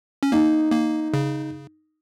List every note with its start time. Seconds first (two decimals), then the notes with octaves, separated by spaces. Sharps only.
0.23 C#4
0.32 A#3 D#4
0.72 A#3
1.14 C#3